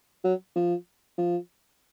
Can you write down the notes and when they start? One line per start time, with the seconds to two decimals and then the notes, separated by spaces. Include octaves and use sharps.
0.24 F#3
0.55 F3
1.18 F3